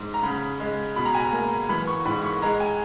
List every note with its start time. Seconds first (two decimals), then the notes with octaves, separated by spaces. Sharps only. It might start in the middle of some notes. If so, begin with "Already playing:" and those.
Already playing: G#2
0.14 A#5
0.23 C#3 B5
0.60 G#3
0.96 B2 B5
1.05 A#5
1.14 G#5
1.24 A#5
1.32 A#3
1.69 E3 B5
1.87 C#6
2.05 G#2 B5
2.24 C#6
2.42 G#3 A#5
2.60 G#5